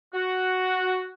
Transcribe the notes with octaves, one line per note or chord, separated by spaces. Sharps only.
F#4